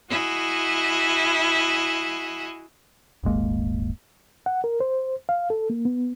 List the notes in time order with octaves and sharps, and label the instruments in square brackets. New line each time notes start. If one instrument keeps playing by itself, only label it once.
[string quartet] E4 F#4 G#4 D#5
[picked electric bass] D#1 G#1 G#3 A#3
[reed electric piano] F#5
A#4
C5
F5
A4
A#3
B3